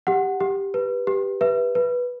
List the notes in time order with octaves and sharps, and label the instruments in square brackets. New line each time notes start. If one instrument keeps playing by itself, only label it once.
[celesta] G4 F#5
G4
B4
G4
B4 E5
B4